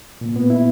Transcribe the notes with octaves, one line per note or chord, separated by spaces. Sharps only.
A#2
B3
E4